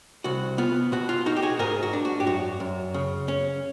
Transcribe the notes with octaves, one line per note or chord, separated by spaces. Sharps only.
C2 F#4
B3 F4
B2 F#4
F4
D#4 F#4
G4
F#4 G#4
G#2 G#4 A#4
F#4
D4
F#4
G4
F#2 F#4
F#2
C#3
C#4